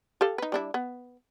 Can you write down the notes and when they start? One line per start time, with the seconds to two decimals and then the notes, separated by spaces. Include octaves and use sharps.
0.21 G4 A4 F5
0.38 D#4 B4
0.52 G3 D4 E4
0.74 B3